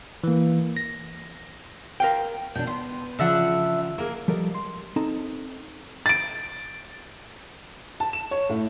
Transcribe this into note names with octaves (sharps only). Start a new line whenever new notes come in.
E3 A#3
A#6
A#4 F5 G5
B2 D4 G5
B3 C6
C#3 F3 D4 E5 F#5
A#3 G#4 A#4
F3 G3 A4 A#4 D#5
C6
C4 D#4 A4 A5 A#5
A6 D7
A5
E7
C#5
A2